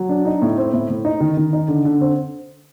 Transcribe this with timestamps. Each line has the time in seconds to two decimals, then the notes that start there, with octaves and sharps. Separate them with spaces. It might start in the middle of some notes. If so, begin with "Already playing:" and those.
Already playing: F#3
0.09 D4
0.25 D#4
0.42 A2
0.58 C4
0.73 A2
0.89 A2
1.05 D#4
1.20 D#3
1.37 D#3
1.53 D#4
1.68 D3
1.85 D3
2.01 C4